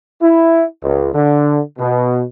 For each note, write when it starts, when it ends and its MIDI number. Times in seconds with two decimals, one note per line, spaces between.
0.20 0.63 64
0.83 1.10 37
1.14 1.58 50
1.78 2.22 47